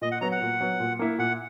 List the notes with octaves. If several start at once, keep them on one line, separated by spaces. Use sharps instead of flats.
A#2 D#5
F#5
F#3 B3 A#5
F#5
A#2
F#3 B3
A#2
A#3 E4
A#2 F#5